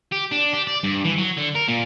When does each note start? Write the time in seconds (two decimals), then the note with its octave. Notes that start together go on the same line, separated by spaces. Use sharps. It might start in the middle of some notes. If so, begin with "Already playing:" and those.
0.12 G4
0.32 D4
0.53 G4
0.67 D5
0.84 G2
1.05 E3
1.18 F#3
1.37 D3
1.55 A#4
1.68 A#2